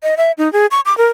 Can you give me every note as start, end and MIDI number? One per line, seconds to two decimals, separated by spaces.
0.03 0.15 75
0.17 0.32 76
0.38 0.51 63
0.53 0.66 68
0.71 0.80 85
0.86 0.96 86
0.98 1.07 70